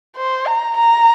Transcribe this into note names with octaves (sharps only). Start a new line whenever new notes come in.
C5
A#5
A#5